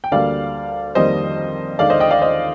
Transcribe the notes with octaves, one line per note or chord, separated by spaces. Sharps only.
G5
D2 D3 G3 A#3 D5 F5
F2 D#3 G3 A#3 C5 D#5
D#2 D3 G#3 D5 F5
C5 D#5
D#5 G5
D5 F5
C5 D#5